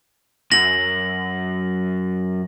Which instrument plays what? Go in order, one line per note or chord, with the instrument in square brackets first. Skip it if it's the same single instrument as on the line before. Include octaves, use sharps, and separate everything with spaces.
[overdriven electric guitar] F#2 [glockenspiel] A#6 F#7